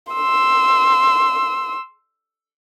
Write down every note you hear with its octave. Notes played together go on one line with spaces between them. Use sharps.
C6 E6